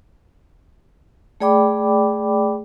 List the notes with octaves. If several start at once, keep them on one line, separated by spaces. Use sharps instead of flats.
A3 G#4 D5 G5 B5 D6